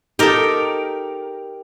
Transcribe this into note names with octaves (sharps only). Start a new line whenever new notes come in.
D#4 G4 A4 A#4